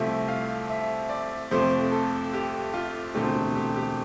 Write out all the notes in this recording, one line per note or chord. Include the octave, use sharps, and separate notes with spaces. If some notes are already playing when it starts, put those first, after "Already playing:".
Already playing: C2 C3 F3 A3 C4 E5
F5
E5
D5
F2 C3 F3 A3 C5
A4
G4
F4
E1 D2 D3 A3 C4 G4
G4
G4